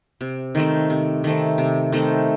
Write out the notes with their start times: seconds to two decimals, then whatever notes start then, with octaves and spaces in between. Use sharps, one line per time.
0.21 C3
0.55 D#3 A3 C4
0.90 C3
1.24 D#3 A3 C4
1.58 C3
1.92 D#3 A3 C4